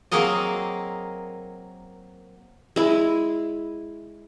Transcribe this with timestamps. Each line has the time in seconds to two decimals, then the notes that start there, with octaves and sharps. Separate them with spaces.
0.12 F#3 A#3 C4 G#4 A#4 D#5
2.76 G#3 E4